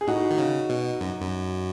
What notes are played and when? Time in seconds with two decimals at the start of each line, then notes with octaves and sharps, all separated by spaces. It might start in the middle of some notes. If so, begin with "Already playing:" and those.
0.01 G#4
0.07 A2 D#4 F#4
0.31 D#3
0.38 C#3
0.70 B2
1.01 F#2
1.21 F#2